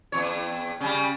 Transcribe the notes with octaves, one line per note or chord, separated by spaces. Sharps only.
E2 C#5
C#3 G3